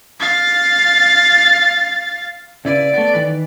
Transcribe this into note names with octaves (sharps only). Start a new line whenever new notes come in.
F5 A6
C#3 E4 B4 D5
A3 B3
D#3 E3 B4